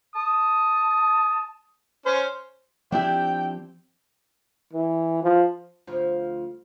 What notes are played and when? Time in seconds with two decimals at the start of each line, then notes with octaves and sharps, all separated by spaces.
0.15 A5 D#6
2.06 C#4 C5
2.92 F3 C4 D4 E4 G4 G5
4.73 E3
5.23 F3
5.87 D2 F3